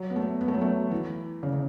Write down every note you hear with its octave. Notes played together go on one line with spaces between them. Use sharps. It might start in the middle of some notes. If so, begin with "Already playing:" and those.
Already playing: F#3
B3
A3
B3
A3
F#3
A3
E3
C#3
C#3